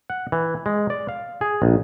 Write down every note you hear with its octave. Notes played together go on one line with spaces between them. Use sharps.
F#5
E3
G#3
D5
F5
G#4
A#1